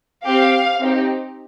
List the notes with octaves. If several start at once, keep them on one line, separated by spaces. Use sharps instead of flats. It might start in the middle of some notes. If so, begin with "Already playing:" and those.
C4 G4 F5
C4 D#4 G4